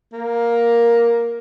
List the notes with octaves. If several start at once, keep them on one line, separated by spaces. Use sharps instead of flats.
A#3